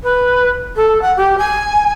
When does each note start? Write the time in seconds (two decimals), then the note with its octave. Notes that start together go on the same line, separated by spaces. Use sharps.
0.03 B4
0.76 A4
1.02 F#5
1.17 G4
1.38 G#5